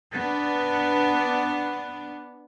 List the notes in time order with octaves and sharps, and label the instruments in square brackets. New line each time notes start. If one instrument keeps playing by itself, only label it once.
[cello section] B3 D4